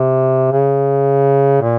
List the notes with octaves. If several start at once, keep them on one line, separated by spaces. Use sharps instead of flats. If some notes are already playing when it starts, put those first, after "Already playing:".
Already playing: C3
C#3
A#2